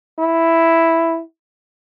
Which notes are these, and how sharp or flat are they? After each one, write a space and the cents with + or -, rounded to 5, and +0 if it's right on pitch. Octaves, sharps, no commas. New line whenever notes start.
E4 +0